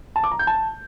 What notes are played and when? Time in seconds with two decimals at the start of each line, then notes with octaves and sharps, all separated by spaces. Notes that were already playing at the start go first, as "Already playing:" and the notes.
0.16 A5
0.24 D6
0.31 A#5
0.39 G6
0.47 A5